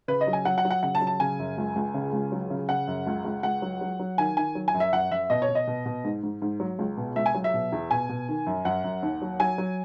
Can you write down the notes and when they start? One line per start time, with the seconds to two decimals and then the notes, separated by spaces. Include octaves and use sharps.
0.08 C#3 B4
0.21 D#5
0.27 F#3
0.33 G#5
0.45 F#3 F#5
0.58 F#5
0.65 F#3
0.71 F#5
0.83 C#3 F#5
0.95 A5
1.01 F#3
1.07 A5
1.20 C#3 G#5
1.39 F#2
1.58 C#2
1.76 C#2
1.94 C#3
2.13 C#2
2.32 F#3
2.50 C#3
2.69 C#3 F#5
2.87 F#2
3.07 C#2
3.25 C#2
3.43 C#2 F#5
3.62 F#3
3.81 F#3
3.99 F#3
4.18 D#3 G#5
4.37 D#3 G#5
4.55 F#3
4.68 G#5
4.74 F#2
4.80 E5
4.93 F#2 F#5
5.11 F#2 E5
5.30 B2 D#5
5.42 C#5
5.49 B2
5.55 D#5
5.67 B2
5.86 B2
6.04 G#2
6.23 G#2
6.42 G#2
6.60 F#3
6.79 C#2
6.97 B2
7.16 C#2 E5
7.26 G#5
7.34 F#3
7.44 E5
7.54 B2
7.72 E2
7.91 B2 G#5
8.09 B2
8.29 D#3
8.47 F#2
8.65 F#2 F#5
8.84 F#2
9.03 D#2
9.22 F#3
9.40 F#3 G#5
9.58 F#3